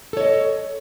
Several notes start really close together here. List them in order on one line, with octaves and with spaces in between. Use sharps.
A4 C#5 D#5